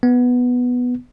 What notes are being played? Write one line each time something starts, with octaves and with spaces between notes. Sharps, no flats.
B3